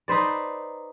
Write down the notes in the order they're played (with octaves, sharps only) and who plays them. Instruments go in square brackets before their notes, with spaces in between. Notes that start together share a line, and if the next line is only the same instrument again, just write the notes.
[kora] D#4 B4 C5 D5